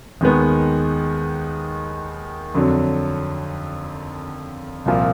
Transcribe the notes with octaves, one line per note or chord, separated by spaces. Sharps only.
D#2 D#3 G#3 B3
F2 D3 F#3
C2 A#2 F3